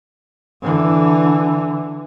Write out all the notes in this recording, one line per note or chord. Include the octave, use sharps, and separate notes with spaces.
D3 E3